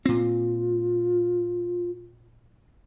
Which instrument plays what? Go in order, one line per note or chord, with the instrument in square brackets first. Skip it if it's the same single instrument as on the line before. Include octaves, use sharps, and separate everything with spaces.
[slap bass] A#2 C4 [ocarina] F4